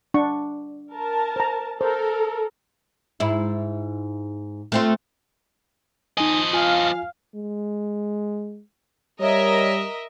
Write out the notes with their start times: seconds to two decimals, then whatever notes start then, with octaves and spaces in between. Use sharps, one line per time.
0.14 D4 F#5 C#6
0.93 A#4 A5
1.36 C5 A#5
1.81 A4 A#4 C5
3.20 G#2 E4
4.72 A3 C4 F4
6.18 F3 D#4 D#5 G#5
6.53 F4 F5 G#5
7.35 G#3
9.20 G3 A#4 C#5 D#5 E5